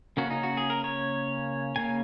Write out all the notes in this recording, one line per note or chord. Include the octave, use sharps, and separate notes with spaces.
C#3 A#3 C#4 F#4
D#4
F#4
G#4
A#4
C#5
C#3 A#3 C#4 G#5